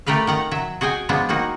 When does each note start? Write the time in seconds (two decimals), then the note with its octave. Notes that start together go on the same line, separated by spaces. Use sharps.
0.06 A3 G4 A#4 B4 F5
0.27 D#3 F#5 A#5
0.51 F#3 E5
0.81 F#4 G#4 D#5 G5 G#5
1.09 F3 G#3 B3 D4
1.29 D#3 A#3 D#4 F#4